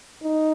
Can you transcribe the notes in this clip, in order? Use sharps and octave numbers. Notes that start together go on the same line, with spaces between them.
D#4